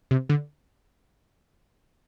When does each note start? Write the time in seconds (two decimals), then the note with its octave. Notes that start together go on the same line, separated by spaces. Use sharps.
0.11 C3
0.29 D3